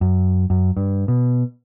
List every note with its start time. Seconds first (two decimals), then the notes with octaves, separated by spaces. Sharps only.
0.01 F#2
0.50 F#2
0.77 G2
1.08 B2